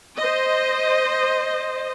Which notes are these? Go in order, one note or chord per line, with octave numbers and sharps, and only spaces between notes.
C5 D#5